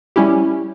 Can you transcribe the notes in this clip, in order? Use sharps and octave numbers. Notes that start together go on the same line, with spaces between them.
G3 C#4 E4 G4